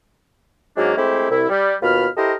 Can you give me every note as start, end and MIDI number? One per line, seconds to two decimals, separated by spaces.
0.77 0.93 44
0.77 0.93 54
0.77 0.93 56
0.77 0.93 58
0.77 0.93 61
0.77 0.93 62
0.97 1.30 56
0.97 1.30 57
0.97 1.30 60
0.97 1.30 64
0.97 1.30 67
0.97 1.30 72
1.30 1.46 36
1.30 1.46 64
1.50 1.73 55
1.82 2.07 39
1.82 2.07 47
1.82 2.07 65
1.82 2.07 83
1.82 2.07 89
2.17 2.34 64
2.17 2.34 67
2.17 2.34 69
2.17 2.34 70
2.17 2.34 72
2.17 2.34 75